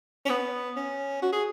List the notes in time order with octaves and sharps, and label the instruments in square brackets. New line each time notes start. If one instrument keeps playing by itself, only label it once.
[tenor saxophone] C#4
B3
C#4
F#4
G#4